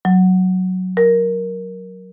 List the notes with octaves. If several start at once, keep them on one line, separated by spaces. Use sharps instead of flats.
F#3
A#4